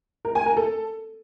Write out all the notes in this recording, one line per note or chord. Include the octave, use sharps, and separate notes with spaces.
A#4
G#5
A#4
A4